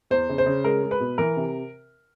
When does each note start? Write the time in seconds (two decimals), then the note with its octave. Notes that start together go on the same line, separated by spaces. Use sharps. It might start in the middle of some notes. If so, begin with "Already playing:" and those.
0.10 E2 C5
0.29 C#3
0.38 C5
0.46 C#3
0.64 G#3 A#4
0.83 G#3
0.91 B4
1.00 B2
1.18 E3 A#4
1.36 C3